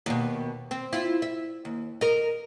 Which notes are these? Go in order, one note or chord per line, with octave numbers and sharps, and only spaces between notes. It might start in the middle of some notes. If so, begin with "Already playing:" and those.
D#2 B2
C4
E4 F4
E5
D#2
A#4 D#5